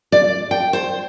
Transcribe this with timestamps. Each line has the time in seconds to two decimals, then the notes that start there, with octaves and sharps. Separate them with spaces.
0.12 D5
0.51 G5
0.73 C5